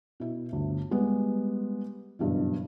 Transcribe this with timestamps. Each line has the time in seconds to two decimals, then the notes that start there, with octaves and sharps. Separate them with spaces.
0.20 B2 E4
0.53 G1 D2
0.91 G3 G#3 B3
2.19 F#1 G2 B2 E3